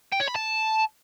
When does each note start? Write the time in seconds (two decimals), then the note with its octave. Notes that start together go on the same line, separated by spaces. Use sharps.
0.12 G5
0.20 C#5
0.28 B5
0.35 A5